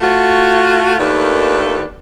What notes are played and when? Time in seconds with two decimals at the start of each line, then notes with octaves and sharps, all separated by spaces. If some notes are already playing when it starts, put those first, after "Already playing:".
0.01 A3 F4 F#4
0.98 D#2 D#3 A3 D4 F4 B4